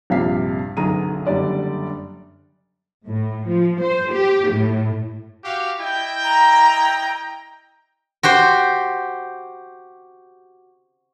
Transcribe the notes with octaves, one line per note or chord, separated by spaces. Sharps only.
A#1 G2 C3 F5 B6 C7
B1 F#2 D3 G#4 A#5 D#7
F#1 D3 G3 D5
A2
F3
C5
G4
A2
F#4 G4 F5
E4 D#5 G5
A#5
F#4 G4 C5